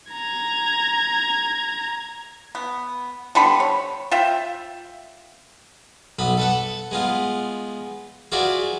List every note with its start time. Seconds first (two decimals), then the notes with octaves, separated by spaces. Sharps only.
0.12 A#5 G#6
2.55 B3
3.35 D3 G3 B3 B5
3.60 C#5
4.11 F4 E5 G5
6.19 B1 B3 B5
6.37 A4 B4 F#5
6.91 G#3 B3 F4
8.32 F4 F#4 G#4 B4 D5 E5